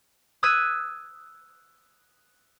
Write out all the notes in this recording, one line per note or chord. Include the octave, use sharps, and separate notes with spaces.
D#6 E6 F#6 G#6 B6 D#7